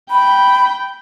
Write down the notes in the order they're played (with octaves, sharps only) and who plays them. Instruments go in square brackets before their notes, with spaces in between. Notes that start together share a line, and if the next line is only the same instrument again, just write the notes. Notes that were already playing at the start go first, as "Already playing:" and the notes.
[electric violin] G5 [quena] B5